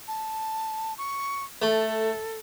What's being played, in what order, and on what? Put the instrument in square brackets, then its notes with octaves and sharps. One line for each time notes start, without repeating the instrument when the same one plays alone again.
[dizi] A5
C#6
[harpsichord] A3 [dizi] A4